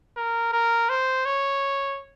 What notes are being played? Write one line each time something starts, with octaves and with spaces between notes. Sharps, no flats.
A#4
A#4
C5
C#5